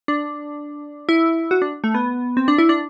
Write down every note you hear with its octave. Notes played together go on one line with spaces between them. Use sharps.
D4
E4
F#4
D4
A3
B3
C4
D4
E4
D4